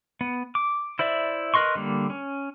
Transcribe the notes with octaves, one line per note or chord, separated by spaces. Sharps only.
B3
D6
E4 C5 D5 E5
A#4 B4 D#5 C6 C#6
D3 G3 A#3
C#4